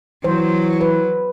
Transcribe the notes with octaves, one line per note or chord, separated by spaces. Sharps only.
E3 F#3 C5
B4